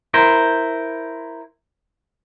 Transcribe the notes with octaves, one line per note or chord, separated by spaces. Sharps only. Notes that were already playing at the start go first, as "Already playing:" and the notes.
E4 A#4 C5